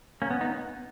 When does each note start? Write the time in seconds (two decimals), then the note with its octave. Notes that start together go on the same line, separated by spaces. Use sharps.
0.22 A#3 C#4
0.31 B3
0.41 B3 D#4